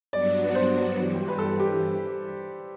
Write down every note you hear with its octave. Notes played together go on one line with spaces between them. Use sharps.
G2 F#3 B3 D4 F#4 D5
C5
G2 E3 G3
B4
A4
G4